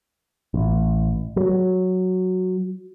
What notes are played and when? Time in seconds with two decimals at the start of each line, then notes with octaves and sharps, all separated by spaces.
0.54 A1
1.36 F#3